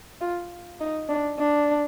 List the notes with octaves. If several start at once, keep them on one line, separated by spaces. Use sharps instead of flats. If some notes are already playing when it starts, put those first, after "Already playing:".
F4
D#4
D4
D4